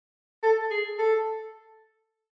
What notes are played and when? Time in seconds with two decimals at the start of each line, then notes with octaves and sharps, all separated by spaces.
0.43 A4
0.71 G#4
0.99 A4